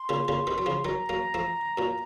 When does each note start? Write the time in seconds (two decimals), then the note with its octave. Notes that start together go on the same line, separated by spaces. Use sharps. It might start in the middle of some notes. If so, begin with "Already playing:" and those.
Already playing: C6
0.09 A#2 C#3
0.28 A#2 C#3
0.47 C3 D#3
0.58 F#3
0.66 C#3 F3
0.85 D#3 F#3 A#5
1.09 F#3 A#3
1.34 F3 A3
1.78 F#2 A#2